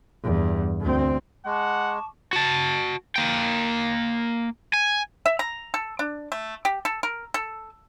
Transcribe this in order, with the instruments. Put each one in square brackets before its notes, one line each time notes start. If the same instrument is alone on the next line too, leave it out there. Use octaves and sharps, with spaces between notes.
[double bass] E2 G2
D2 C4
[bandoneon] G#3 [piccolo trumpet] F#5 [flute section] A5 C#6 D6
[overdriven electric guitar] F#4 A5
A#3 G5
G#5
[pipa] E5
A#5
A4
D4
A3
G4
A4
A#4
A4